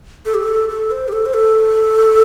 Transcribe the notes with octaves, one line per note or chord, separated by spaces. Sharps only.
A4
G4
A4
A4
C5
G4
A4
C5
A4